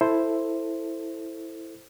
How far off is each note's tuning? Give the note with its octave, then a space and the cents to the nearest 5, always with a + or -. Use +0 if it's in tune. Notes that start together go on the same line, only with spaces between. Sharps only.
E4 +0 A4 +10 C5 +0